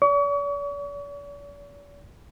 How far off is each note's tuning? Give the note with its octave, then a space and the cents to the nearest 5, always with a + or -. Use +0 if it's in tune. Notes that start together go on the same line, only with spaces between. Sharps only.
D5 -45 C#6 +40